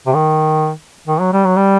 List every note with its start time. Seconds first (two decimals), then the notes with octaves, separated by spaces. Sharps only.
0.07 C3
0.15 D#3
1.08 D#3
1.20 F#3
1.33 G3
1.45 F#3
1.57 G3